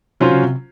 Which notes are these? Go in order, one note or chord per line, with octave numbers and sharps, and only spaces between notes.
C3 F#3 C#4 F4 C5
C#3
C3